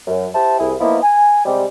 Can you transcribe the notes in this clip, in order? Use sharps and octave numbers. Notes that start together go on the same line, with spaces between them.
F#2
E4 G4 C5 E5 A5
C2 E4 G#4
F3 A#3 B3 D#4 E4
G#5
C3 G3 G#3